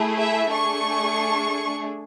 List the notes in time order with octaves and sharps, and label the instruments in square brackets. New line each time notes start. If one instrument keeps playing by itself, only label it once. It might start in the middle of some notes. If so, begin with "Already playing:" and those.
Already playing: [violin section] A3 E4 G#4
E5
A3 D4 G#4 C#6